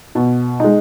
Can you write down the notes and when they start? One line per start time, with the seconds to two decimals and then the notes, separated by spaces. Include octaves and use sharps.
0.15 B2
0.60 G#3 D#4